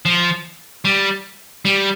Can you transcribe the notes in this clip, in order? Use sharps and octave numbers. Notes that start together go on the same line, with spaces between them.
F3
G3
G3